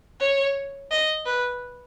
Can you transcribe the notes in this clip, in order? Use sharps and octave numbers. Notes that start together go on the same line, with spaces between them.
C#5
D#5
B4